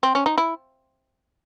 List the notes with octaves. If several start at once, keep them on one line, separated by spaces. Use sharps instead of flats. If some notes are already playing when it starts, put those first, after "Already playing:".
C4
C#4
D#4
E4